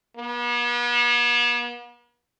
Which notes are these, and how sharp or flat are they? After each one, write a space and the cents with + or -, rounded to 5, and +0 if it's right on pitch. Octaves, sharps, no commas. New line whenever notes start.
B3 -45